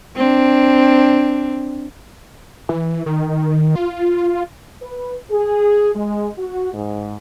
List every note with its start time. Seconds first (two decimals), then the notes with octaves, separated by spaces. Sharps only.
0.16 C4 D4
2.69 E3
3.06 D#3
3.75 F4
4.82 B4
5.31 G#4
5.95 G#3
6.38 F#4
6.73 G#2